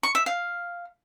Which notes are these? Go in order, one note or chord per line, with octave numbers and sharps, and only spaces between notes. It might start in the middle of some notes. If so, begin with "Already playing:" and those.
C#6
E5
F5